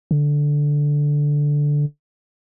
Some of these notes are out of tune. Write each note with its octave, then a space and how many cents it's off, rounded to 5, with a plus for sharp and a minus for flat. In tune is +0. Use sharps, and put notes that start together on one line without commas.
D3 -5